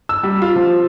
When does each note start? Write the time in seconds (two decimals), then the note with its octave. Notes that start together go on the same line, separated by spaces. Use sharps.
0.09 E6
0.23 G3
0.42 F4
0.56 F3